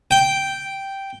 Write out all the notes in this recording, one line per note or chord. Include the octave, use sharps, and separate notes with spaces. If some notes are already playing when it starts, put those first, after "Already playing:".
G5